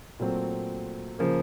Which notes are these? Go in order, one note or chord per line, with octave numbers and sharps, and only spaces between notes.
A#2 F#3 A3 C4
C#3 F3 A#3